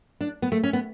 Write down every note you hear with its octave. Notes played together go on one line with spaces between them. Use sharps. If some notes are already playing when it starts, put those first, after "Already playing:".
D4
B3
A3
C#4
B3